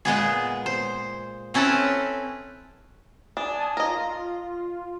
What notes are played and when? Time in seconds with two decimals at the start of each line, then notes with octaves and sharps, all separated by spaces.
0.05 A#2 G#3 B3 G#4
0.66 C5
1.54 C4 C#4 E4 A4 B4
3.37 D4 G#5 A5 D#6
3.77 F4 A#4 D#5